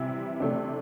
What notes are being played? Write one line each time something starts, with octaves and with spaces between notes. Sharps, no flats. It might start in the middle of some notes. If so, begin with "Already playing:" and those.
Already playing: C3 E3 G3 E4
C3 A3 D4